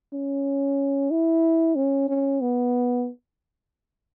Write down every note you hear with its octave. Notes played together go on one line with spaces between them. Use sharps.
C#4
E4
C#4
C#4
B3